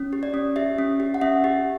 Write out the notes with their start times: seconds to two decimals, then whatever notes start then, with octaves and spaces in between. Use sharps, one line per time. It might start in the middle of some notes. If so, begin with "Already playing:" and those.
Already playing: C#4
0.13 G4
0.23 D5
0.34 C#4
0.56 G4 E5
0.78 C#4
1.00 G4
1.14 F#5
1.21 C#4 E5
1.44 G4